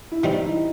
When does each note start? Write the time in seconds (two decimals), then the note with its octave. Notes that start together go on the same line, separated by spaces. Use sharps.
0.12 E4
0.23 E3 G3 C4 D#4
0.38 D#4
0.43 E4